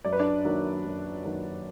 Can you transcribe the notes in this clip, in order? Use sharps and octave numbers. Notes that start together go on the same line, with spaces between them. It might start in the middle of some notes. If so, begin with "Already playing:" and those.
F#2 D5
B4
D4 D5
D#3 F#3 A#3
F#2
D#3 F#3 A#3